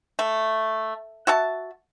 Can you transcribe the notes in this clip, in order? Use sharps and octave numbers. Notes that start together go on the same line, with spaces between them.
A3
F#4 E5 A5